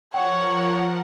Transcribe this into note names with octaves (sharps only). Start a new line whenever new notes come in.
F3 A#4 C#5 F#5 G5